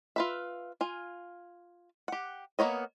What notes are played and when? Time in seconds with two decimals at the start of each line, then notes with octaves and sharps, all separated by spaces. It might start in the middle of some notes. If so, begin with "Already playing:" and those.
0.16 F4 B4 E5
0.81 F4 G#5
2.08 G4 F#5
2.59 A#3 B3 C#5 D#5